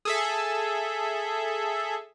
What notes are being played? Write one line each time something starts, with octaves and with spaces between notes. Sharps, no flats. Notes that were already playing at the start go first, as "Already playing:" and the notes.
G#4 A4 E5